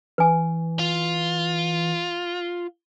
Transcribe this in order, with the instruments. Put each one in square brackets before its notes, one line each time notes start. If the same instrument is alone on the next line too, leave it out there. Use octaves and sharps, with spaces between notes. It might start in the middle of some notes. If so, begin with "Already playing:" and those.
[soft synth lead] E3 [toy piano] B4 G#5
[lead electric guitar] F4